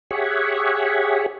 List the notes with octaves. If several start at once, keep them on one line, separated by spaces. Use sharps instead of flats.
G4 G#4 C#5 E5 F#5